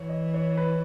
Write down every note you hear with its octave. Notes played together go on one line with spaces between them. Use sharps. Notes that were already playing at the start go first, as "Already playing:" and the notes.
Already playing: E3 C#5
D#5
C#5
B4